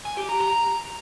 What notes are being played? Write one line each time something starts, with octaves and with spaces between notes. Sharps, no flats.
G#5
G4
A#5
A#5